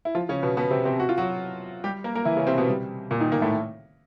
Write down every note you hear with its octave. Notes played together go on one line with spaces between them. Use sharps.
E4
F3 F4
C#3 C#4
B2 B3
B2 B3
C3 C4
C3 C4
F#4
F4
F#3 F#4
G3 G4
A#3 A#4
A#3 A#4
E3 E4
C#3 C#4
C3 C4
B2 B3
G3
A#2 A#3
D#3 D#4
A#2 A#3
A2 A3